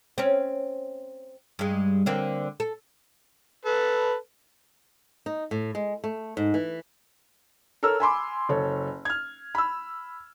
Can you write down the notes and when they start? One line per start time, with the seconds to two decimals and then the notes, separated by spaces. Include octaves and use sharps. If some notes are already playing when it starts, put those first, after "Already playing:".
0.18 C4 C#4
1.59 G2 G#3
2.06 D3 A#3 C4
2.60 A4
3.65 A4 B4
5.26 D#4
5.51 A2
5.75 G#3
6.04 A3
6.37 G#2
6.54 E3
7.83 A4 A#4 C#5 E6 F6
8.00 G#5 B5 C6 D6
8.49 F#1 A4 C#5
9.05 F6 G#6
9.55 B5 E6